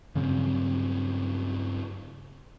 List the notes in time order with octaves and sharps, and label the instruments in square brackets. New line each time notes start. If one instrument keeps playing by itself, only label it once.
[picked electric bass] G2 C#3 F#3 C4